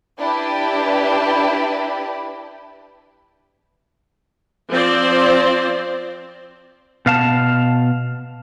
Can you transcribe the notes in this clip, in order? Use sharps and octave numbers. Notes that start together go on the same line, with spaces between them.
D4 E4 G4 B4
F3 C4 C5 D5
B2 F5 A5